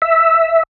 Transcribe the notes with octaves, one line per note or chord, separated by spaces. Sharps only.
E5